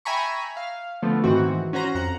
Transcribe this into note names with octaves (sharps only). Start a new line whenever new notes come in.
E5 G5 G#5 A#5 B5 C#6
F5
D3 F3 A3 B3
G#2 D#3 E3 C4 F#4
C#4 F#4 C5 A#5
F2 F#5 A#5